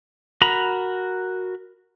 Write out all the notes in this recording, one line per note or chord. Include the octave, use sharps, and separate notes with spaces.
F#4 A#4 A#5 B5